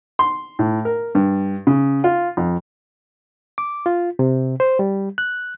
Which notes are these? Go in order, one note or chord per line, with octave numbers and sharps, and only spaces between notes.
C6
A2
A#4
G2
C#3
F4
F2
D6
F4
C3
C5
G3
F#6